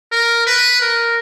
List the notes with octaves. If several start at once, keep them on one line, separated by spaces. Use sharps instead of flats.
A#4
B4
A#4